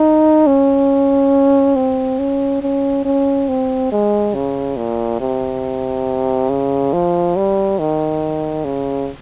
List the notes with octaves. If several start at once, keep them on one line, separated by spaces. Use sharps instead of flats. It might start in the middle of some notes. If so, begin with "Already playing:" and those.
Already playing: D#4
C#4
C4
C#4
C#4
C#4
C4
G#3
C#3
A#2
C3
C#3
F3
G3
D#3
C#3